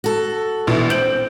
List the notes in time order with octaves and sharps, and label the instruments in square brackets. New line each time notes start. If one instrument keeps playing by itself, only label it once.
[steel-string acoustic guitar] F#4 A4
[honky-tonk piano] A#1 B2 E3
[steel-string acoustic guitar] C4 [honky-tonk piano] G6 D7 F#7